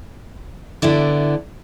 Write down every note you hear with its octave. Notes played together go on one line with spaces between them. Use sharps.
D3 B3 E4 D5